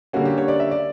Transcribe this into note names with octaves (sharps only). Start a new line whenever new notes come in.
D3 G3 A#3 C#4 F#4
G4
C#5
D5
E5
D5